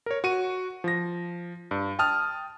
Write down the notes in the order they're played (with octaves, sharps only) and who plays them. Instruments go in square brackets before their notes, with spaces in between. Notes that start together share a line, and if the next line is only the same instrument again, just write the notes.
[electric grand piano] A#4 C#5
F#4 C#6 D#7
F3 A#6
G2
G5 A5 D#6 F6